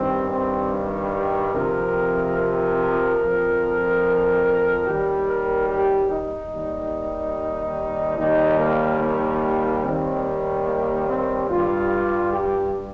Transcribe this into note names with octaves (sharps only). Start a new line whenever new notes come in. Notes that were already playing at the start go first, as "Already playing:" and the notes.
Already playing: G2 D#3 G3 C4
C4
F2 C3 F3 A#4
A#4
F2 F3
D#2 D#3 G3 G4
A#4
G4
D#4
D#2 D#3 G3
D#2 D#3 G3 D#4
A#3
A#3
D#2 D#3 G3 C4
A#3
C4
G2 G3 F4
G4